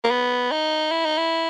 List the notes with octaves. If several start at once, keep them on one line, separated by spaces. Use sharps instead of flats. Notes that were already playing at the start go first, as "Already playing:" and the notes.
A#3
B3
D#4
E4
D#4
E4